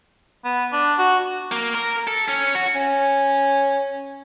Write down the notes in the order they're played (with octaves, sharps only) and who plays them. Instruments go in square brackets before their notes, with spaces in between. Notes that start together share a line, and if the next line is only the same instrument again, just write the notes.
[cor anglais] B3
D4
F#4
[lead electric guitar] A#3
A#4
A4
C#4
F#4
[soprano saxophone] C#4